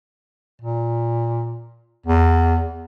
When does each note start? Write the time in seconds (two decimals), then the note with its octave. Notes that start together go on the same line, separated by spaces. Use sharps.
0.61 A#2
2.06 E2